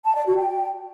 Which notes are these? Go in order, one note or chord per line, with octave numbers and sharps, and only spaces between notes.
A5
D5
F#4
G5